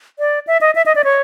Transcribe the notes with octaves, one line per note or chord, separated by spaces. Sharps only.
D5
E5
D#5
E5
D#5
D5
C#5